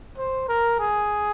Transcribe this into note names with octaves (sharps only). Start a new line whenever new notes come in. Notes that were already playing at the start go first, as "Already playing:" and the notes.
C5
A#4
G#4